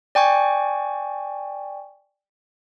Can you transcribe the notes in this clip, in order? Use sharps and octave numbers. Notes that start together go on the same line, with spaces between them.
D5 G5 G#5 C#6